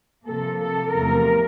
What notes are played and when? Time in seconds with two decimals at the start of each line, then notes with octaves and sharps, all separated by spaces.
0.25 C3 F3 A#3 A4
0.59 A4
0.92 E2 C3 F3 A3 A#4